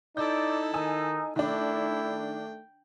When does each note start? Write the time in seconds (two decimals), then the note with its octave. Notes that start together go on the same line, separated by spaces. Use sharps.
0.17 D#4 E4 A4 D5 G6
0.74 D#3 D#4 G#5 E6
1.36 D#3 A3 D4 E4 G5